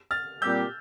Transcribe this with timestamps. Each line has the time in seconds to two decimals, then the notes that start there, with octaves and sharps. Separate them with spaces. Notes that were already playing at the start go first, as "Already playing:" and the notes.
0.11 F6 A6
0.42 A#2 G3 C4 G4 E6 G6